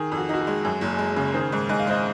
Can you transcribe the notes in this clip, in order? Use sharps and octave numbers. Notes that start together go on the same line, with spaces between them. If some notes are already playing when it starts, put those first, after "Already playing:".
Already playing: D#3 G#4
F2
F#4
D#4 F#4
G#4
G#3
F#2
F#1
G#3
C#3
D#3 G#4 C5
G#2
G#2 D#5
F5
G#3 C5 D#5